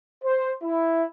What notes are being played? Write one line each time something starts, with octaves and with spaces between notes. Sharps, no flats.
C5
E4